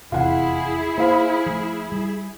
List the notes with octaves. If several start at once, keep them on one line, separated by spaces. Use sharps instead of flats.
F1 E2 C3 E4 F4 G#4 F#5
A#3 C5 F5 B5
F3 A3
G3